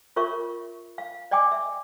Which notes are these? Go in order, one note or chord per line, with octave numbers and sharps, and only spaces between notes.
F4 A#4 C#5 E5 C#6
F5
D5 D#5 G5 G#5 D6
E5